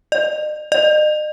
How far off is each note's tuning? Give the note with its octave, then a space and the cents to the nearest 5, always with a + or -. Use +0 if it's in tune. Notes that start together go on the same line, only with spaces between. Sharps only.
D#5 -45
D#5 -40